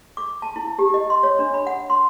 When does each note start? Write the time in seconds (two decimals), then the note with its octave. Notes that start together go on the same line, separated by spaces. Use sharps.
0.17 D6
0.42 A5
0.56 E4
0.79 G4
0.94 D#5
1.10 C6
1.23 C#5
1.39 D4
1.54 B5
1.67 F#5
1.90 C6